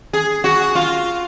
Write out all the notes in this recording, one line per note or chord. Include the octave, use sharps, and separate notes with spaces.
G#4
F#4
F4